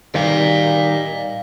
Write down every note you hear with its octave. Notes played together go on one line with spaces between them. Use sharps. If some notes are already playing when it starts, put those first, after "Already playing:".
D#3 G3 D5 F5